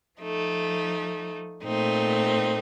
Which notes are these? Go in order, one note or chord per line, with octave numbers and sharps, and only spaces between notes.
F3 A3 D#4
A#2 A3 C4 D#4